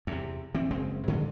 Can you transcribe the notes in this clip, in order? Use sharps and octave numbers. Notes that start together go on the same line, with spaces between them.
E2 C3
E3 C4
F#1 C#3 G#3 C4
G#2 D3 D#3 G#3